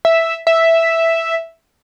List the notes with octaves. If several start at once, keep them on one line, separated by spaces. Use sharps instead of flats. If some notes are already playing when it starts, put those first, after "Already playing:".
E5
E5